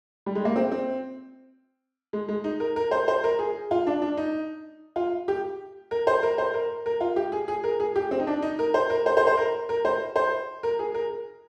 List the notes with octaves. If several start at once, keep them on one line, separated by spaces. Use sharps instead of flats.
G3
G#3
A#3
C4
C4
G#3
G#3
D#4
A#4
A#4
C5
C5
A#4
G#4
F4
D4
D4
D#4
F4
G4
A#4
C5
A#4
C5
A#4
A#4
F4
G4
G#4
G#4
A#4
G#4
G4
C4
D#4
D4
D#4
A#4
C5
A#4
C5
C5
C5
A#4
A#4
C5
C5
A#4
G#4
A#4